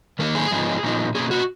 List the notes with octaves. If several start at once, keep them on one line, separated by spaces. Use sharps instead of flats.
D#3 A#3 D#4 A#4
G#4
G#2 F3 B3 D#4
A#2 F3 B3 D#4
B2 A#3 C#4 G#4
F#4